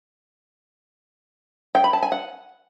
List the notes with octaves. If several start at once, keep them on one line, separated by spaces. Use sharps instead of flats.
G5
B5
A5
G#5
F#5